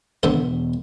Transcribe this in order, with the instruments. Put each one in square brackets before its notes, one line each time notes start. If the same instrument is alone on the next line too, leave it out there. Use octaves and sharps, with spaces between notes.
[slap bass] E1 B3 [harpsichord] D3 C5